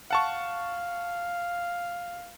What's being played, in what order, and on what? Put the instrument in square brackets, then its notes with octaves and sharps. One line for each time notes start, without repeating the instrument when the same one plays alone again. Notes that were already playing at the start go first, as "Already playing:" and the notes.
[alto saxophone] F5 [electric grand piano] F#5 A5 C#6